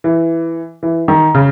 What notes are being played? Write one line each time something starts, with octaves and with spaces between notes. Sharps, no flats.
E3
E3
D#3
C#3